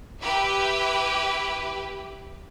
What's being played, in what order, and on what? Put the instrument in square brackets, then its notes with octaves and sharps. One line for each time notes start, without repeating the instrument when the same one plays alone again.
[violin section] E4 G4 B4